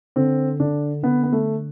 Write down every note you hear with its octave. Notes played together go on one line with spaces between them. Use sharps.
D3 C4
D3 D4
D3 B3
B3
A3